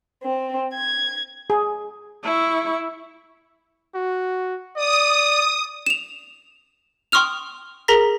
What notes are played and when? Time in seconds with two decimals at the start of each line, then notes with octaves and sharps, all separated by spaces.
0.23 C4
0.73 G#6
1.50 G#4
2.23 E4 C#6
3.95 F#4
4.76 D5 D#6
5.86 E7 F7
7.12 G5 C6 C#6 D#6 F6 F7
7.88 G#4 A#4 A#5 A#6 B6